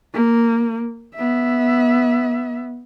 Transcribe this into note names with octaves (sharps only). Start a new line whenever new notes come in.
A#3
B3 E5